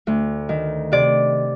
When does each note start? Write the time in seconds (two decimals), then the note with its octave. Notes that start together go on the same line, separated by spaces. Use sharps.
0.07 D2
0.49 D#3
0.92 C3 D5